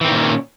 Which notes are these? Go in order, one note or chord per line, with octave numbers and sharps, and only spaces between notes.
A#2 D#3 E3 C4 C#4